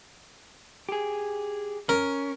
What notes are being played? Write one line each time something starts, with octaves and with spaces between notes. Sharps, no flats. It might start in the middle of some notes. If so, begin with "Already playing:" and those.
G4 G#4
C#4 A#4